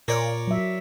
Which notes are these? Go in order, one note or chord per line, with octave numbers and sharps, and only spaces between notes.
A#2 A#4 C#5 D5
F#3 E5